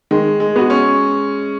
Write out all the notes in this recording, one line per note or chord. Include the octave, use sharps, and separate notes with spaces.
D#3 G#3
G#3
B3 F#4
C#4